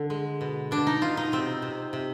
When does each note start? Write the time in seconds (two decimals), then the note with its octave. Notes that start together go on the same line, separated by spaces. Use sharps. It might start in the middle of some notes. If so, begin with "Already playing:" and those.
Already playing: D3
0.10 G#3
0.41 B2
0.71 B2 D4
0.87 D#4
1.01 B2 F4
1.17 D#4
1.32 C3 C4
1.62 C3
1.93 C3